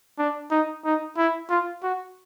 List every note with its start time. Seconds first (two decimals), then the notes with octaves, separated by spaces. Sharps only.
0.19 D4
0.51 D#4
0.85 D#4
1.17 E4
1.50 F4
1.83 F#4